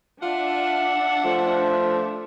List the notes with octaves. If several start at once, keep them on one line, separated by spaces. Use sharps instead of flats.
D4 F4 E5 F#5
F3 A3